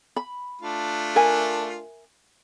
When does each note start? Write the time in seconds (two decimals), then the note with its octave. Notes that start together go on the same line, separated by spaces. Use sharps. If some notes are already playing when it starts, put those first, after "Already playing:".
0.16 B5
0.61 A3 D4 F4
1.16 A#4 E5 G#5